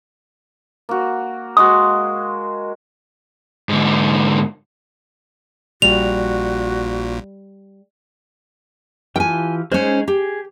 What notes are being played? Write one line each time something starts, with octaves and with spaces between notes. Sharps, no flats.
A#3 F#4
G#3 F#4 D#6
G#2 D3
A#1 A#2 G3 F#4 F7
E3 F4 G4 G5 G#5
G#3 C#4 D#4 G#4 C5
G4 G#4